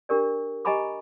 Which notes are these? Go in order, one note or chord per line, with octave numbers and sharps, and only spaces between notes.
D4 G4 A#4 D5
G4 D#5 G#5 A#5 B5 D6